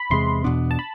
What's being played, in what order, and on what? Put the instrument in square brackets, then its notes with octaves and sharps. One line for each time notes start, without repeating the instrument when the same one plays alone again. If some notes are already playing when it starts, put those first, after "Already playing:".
Already playing: [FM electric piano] B5
[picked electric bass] E2 C3 G#3 [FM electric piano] C6
[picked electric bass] E2 B2 B3 D4
[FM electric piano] A5
B5